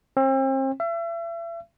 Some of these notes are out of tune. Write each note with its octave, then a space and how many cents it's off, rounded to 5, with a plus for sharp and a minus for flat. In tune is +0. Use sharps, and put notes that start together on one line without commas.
C4 +40
E5 +35